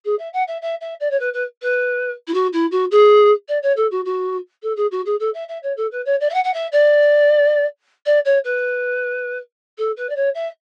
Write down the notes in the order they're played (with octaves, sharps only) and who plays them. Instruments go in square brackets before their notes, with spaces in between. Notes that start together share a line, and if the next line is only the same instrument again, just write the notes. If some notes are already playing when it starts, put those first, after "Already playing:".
[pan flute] G#4
E5
F#5
E5
E5
E5
D5
C#5
B4
B4
B4
E4
F#4
E4
F#4
G#4
D5
C#5
A4
F#4
F#4
A4
G#4
F#4
G#4
A4
E5
E5
C#5
A4
B4
C#5
D5
E5
F#5
F#5
E5
D5
D5
C#5
B4
A4
B4
D5
C#5
E5